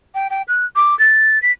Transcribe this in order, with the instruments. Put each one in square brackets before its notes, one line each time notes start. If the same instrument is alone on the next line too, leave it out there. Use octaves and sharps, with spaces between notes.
[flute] G5
G5
F#6
D6
A6
B6